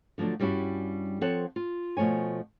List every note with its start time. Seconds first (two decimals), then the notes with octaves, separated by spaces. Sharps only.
0.18 D3 F3 F#3 A3 D4
0.40 G2 G3 C#4 E4 F#4
1.21 F3 C4 A4 C#5 F#5
1.56 F4
1.97 B2 F3 A3 C#5 G#5